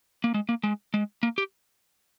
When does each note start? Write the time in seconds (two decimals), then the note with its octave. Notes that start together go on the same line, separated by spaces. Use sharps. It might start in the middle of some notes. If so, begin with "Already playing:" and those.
0.24 A#3
0.34 G#3
0.49 A#3
0.64 G#3
0.94 G#3
1.23 A#3
1.38 G4